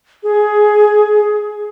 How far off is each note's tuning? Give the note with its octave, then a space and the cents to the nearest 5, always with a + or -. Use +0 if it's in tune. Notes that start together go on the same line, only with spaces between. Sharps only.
G#4 +15